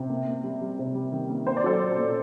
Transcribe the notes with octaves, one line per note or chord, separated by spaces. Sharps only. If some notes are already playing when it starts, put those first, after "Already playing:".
Already playing: C3
A#3
A#3
G3
G3
C3
G3
D#3
A#3
A#3 C5
D5
F#3 A4 C5
A#2
A#2